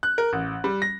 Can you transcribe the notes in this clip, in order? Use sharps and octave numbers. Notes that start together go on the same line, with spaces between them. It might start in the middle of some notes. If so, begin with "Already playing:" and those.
F#6
A#4
A1
G3
A#6